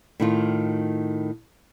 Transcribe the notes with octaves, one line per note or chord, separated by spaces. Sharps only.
A2 D#3 F4